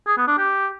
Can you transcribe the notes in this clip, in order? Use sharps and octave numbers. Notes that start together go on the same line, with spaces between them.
G#4
B3
D4
G4